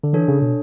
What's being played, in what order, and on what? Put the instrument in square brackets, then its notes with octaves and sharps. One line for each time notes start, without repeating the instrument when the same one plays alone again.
[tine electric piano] D3
[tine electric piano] E3 [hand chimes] D4 A4 C#5
[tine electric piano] C#3
B2